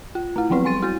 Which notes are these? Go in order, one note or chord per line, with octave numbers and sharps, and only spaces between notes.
F4
A3 E4
F3 F#3 B3 C4 B4
G3 C6 A6 D#7
E4 F#4 A6